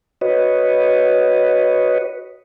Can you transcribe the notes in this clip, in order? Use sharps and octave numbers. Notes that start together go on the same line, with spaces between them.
F#4 B4 C#5 D#5